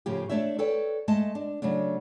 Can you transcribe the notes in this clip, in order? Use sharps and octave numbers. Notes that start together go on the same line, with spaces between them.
A2 C#3 F3 G4
A3 D4 C#5 D5 E5
A4 B4 C#5 D5 G5
G#3 A3 D#5 A5
D4
C#3 F#3 A3 D4